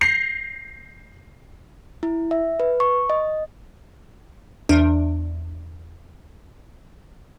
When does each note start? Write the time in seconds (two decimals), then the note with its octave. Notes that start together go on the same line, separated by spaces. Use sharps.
0.01 G6 A#6 C7 F7
2.03 E4
2.31 E5
2.60 B4
2.80 C#6
3.10 D#5
4.69 E2 D4